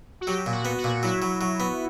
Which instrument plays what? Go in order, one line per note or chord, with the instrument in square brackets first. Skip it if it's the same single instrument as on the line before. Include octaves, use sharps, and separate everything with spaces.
[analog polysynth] F#4
[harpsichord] F#3 [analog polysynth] G4
[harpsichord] A#2
[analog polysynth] F#4
[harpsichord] B3
[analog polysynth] F#4
[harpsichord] A#2
[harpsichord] F#3 [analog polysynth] E4
[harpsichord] F#3
F#3
B3